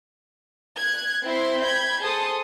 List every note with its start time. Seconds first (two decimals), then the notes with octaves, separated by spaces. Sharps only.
0.80 F#6 G#6
1.26 C4 E4 E5 C6
1.64 B5 G6 G#6
2.01 G#4 A4 C5 A5 C6 D#6